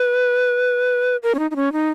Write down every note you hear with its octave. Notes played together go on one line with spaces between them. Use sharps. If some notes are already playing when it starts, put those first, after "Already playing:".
Already playing: B4
A#4
C#4
D#4
D#4
C#4
D#4